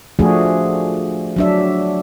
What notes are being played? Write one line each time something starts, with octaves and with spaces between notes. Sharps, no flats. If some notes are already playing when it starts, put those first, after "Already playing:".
F3 A3 D4 F#4 G#4
F#3 D4 E5